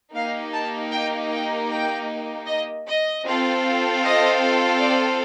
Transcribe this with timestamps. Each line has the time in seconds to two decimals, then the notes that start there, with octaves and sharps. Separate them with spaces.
0.16 A#3 D#4 G4 F5
0.54 A5
0.93 G5
1.32 G5
1.70 G5
2.47 D#5
2.87 D#5
3.25 C4 F4 A4
4.03 D#5
4.79 D5